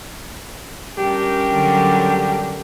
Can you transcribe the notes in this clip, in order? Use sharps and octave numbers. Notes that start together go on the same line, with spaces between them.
G3 C#4 D4 G4 A#4
D3 F#3